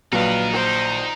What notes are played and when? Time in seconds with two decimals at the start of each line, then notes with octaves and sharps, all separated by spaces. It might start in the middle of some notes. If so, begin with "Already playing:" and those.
0.12 A#1 F#3 D#4 A#4 B4 F5
0.53 C5